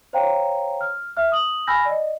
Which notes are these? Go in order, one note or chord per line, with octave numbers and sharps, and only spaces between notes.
C5 C#5 F5 G5 A#5
F6
E5 F6
D#6 F#7
G#5 B5 E6 F6 G6 A#6
D5 D#5